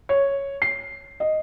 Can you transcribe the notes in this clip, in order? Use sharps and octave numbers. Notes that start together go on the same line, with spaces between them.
C#5
C7
D#5